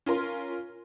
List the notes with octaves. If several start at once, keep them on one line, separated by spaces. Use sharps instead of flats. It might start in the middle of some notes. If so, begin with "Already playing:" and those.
C#4 F4 A#4 C6